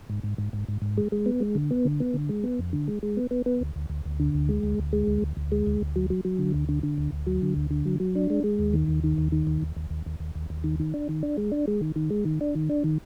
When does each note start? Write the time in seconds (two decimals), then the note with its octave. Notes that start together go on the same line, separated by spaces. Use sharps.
0.10 G#2
0.23 G#2
0.38 G#2
0.53 G#2
0.68 G#2
0.82 G#2
0.98 G#3
1.12 G#3
1.26 B3
1.40 G#3
1.55 D3
1.71 B3
1.85 D3
2.00 B3
2.14 D3
2.29 G#3
2.44 B3
2.59 F2
2.73 D3
2.88 G#3
3.03 G#3
3.17 B3
3.31 B3
3.46 B3
3.61 D2
3.76 D2
3.90 D2
4.05 D2
4.20 D3
4.34 D2
4.49 G#3
4.63 D2
4.79 D2
4.93 G#3
5.07 D2
5.22 D2
5.37 D2
5.52 G#3
5.67 D2
5.81 D2
5.96 F#3
6.10 F#3
6.25 F#3
6.39 D3
6.54 D2
6.69 D3
6.83 D3
6.98 D2
7.12 D2
7.27 F#3
7.42 D3
7.56 D2
7.71 D3
7.86 F#3
8.00 F#3
8.15 D4
8.30 G#3
8.44 G#3
8.59 D#2
8.73 D#3
8.88 D#2
9.04 D#3
9.18 D#2
9.32 D#3
9.47 D#2
9.62 D#2
9.76 D#2
9.90 D#2
10.06 D#2
10.20 D#2
10.35 D#2
10.50 D#2
10.64 D#3
10.80 D#3
10.94 D4
11.09 D#3
11.23 D4
11.38 G#3
11.52 D4
11.67 G#3
11.81 D#3
11.96 D#3
12.10 G#3
12.25 D#3
12.41 D4
12.55 D#3
12.69 D4
12.84 D#3